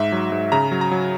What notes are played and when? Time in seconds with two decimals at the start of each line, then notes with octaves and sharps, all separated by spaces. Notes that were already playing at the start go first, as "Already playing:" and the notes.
Already playing: G#2 E5
0.12 F#3
0.32 G#2
0.52 C#3 A#5
0.71 F#3
0.81 A#5
0.91 F#3